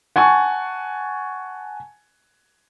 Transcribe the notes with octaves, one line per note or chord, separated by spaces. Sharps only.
F#5 G#5 A5 C#6